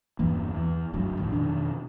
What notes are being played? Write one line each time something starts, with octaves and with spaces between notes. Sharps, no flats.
E2 G2 E3 A#3
E2 E3
F#1 D2 G2 F#3
A1 F2 A2 D#3
F2 B2 D#3 D4